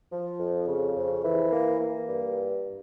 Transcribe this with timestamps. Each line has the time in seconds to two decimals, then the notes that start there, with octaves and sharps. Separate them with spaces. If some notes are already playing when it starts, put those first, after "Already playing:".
0.12 F3
0.40 F2
0.67 C#3
0.96 F2
1.24 E3
1.52 A#3
1.81 A#3
2.08 G2